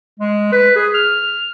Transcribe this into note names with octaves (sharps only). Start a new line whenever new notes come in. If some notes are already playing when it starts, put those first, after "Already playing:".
G#3
B4
G#4
F6